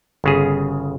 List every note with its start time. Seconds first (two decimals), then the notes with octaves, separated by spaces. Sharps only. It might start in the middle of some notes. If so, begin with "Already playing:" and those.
0.24 G1 C#3 G#4